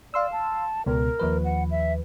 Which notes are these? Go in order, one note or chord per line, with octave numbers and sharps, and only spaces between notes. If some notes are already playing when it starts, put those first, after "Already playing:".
D5 F5 C6 E6
A5
C#2 B2 A#4
D#2 F3 B4
F#5
E5